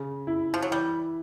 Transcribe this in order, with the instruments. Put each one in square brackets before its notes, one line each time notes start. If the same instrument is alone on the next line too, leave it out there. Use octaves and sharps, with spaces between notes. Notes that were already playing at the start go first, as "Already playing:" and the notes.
Already playing: [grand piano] C#3
E4
[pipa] F3
F#3
[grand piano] E3 [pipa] G3